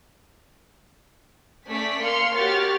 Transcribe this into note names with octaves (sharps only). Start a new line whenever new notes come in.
A3 C#4 A4 D5 B6
A#3 F5 C6 F6 C#7
F#4 G4 A#4 C#5 F6 A6